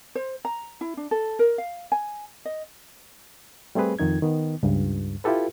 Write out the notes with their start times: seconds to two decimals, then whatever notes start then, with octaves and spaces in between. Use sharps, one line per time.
0.15 C5
0.45 A#5
0.81 E4
0.97 D4
1.11 A4
1.39 A#4
1.58 F5
1.92 G#5
2.45 D#5
3.75 G3 A3 C4 G#4 B4
3.99 F2 D#3 D#4 G#6
4.22 D#3 B3
4.63 C#2 G2
5.24 E4 F4 G4 A4 B4